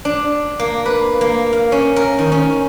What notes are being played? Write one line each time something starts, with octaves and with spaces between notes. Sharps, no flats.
D4
A#3
B4
A#3
F5
C#4
A#4
D#3
C#4